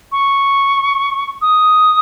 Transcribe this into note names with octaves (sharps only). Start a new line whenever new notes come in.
C#6
D#6